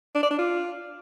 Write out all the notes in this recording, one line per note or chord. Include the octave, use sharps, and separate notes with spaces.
D4
D5
D4
F4